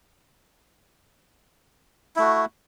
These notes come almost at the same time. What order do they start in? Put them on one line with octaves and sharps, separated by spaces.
E4 A3 F#4